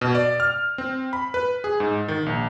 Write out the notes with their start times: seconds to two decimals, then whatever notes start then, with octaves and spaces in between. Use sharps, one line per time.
0.01 B2
0.15 D5
0.40 F6
0.78 C4
1.13 B5
1.34 B4
1.64 G#4
1.80 G#2
2.08 D#3
2.26 A#1